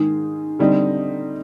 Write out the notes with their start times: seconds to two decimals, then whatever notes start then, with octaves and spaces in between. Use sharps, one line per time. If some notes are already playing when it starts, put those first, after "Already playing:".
Already playing: G#2 D#3 G#3 D#4 G#4
0.59 D3 G3 C4 D#4